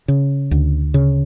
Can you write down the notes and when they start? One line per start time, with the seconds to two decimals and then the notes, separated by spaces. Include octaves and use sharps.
0.08 C#3
0.51 D2
0.94 C#3